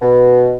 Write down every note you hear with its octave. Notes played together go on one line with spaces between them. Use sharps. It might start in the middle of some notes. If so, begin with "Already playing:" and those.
B2